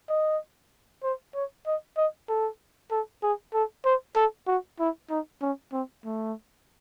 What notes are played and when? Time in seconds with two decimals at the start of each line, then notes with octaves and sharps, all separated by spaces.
0.09 D#5
1.03 C5
1.35 C#5
1.66 D#5
1.97 D#5
2.29 A4
2.91 A4
3.23 G#4
3.54 A4
3.85 C5
4.16 A4
4.47 F#4
4.79 E4
5.10 D#4
5.41 C#4
5.72 C4
6.05 A3